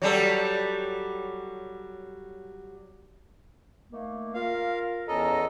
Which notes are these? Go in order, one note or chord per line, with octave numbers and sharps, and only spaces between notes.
F#3 G3 A4
D#3 A3 A#3
F4 A#4 F5
E2 C#4 A4 D#5 A#5